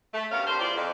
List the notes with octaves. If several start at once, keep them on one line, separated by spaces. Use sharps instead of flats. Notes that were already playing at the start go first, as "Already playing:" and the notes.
A3
G2 B3 C#4 F#4 A#4 F5
C3 D4 A#4 C5
E2 F4 C5 D5
F2